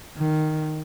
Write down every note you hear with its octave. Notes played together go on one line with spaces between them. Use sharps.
D#3